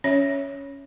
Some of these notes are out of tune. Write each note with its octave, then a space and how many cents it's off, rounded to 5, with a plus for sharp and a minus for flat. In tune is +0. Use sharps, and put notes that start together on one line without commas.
C#4 +5 C#5 +5 E5 +0